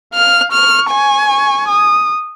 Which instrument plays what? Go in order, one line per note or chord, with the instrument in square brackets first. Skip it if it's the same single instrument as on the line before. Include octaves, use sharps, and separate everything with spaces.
[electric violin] F5 [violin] F6
[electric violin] C#6 [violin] F6
[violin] G#5
[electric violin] C#6
D#6